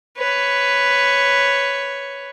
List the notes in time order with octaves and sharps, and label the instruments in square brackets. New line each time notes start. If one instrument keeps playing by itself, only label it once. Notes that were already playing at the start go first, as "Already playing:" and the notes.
[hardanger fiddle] B4 C#5